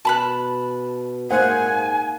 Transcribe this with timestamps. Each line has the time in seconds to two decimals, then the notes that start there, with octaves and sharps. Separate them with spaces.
0.05 B2 A5 B5 F#6
1.31 G#2 A#3 C5 F#5 G#5